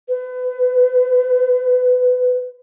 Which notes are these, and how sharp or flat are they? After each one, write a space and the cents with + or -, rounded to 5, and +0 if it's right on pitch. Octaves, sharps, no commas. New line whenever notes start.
B4 +25